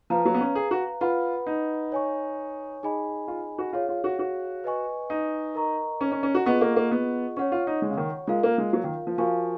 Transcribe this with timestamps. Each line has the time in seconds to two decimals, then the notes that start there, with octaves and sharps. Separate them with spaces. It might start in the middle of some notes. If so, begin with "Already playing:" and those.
0.10 F3 B4 F5 A#5
0.25 F#3
0.34 B3
0.40 C#4
0.55 G#4
0.71 F#4
1.01 F4 B4 F#5 B5
1.46 D#4
1.92 C#5 G#5 C#6
2.83 D#4 G#4 D#5 G#5 B5
3.28 F4
3.58 F#4
3.73 F4 G#4 C#5 F5
3.89 F4
4.04 F#4
4.19 F#4
4.64 B4 D#5 G#5 C#6
5.10 D#4
5.55 A#4 D#5 A#5 C#6
6.01 C#4
6.12 C#4
6.23 C#4
6.35 F#4
6.46 B3 F4 G#4 D#5 F#5 C#6
6.61 A#3
6.76 A#3
6.91 B3
7.37 C#4 C#5 F#5 C#6
7.52 F4
7.67 D#4
7.82 G#3
7.90 C#3
7.97 D#3
8.27 G#3 F4 A#4 F5
8.43 A#3
8.58 G#3
8.73 F#3
8.84 D#3
9.07 F3
9.18 F3 F#4 A#4 F5 G#5 C#6